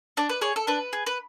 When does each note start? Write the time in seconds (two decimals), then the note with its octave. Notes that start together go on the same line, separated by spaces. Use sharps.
0.17 D4 D5
0.29 B4
0.41 G#4 C#5
0.56 A4
0.67 D4 B4
0.93 G#4
1.06 B4